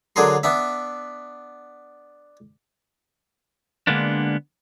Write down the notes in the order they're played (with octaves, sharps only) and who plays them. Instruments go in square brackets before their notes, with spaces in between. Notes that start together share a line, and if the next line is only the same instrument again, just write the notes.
[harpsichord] D3 F#3 D4 G#4 A#4 C6
B3 D4 E5
[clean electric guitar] D3 G#3 A#3 B3 D4